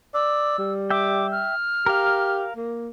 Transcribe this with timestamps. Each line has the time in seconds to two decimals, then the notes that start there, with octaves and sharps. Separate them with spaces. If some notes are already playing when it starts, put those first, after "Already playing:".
0.14 D5 E6
0.58 G3
0.90 E5 G5 D6
1.32 F6
1.86 G4 A#4 F5
2.56 A#3